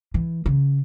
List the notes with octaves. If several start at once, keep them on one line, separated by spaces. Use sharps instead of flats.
E3
C#3